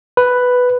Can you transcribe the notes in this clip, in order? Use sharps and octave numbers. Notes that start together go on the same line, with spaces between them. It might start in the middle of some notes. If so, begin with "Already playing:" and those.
B4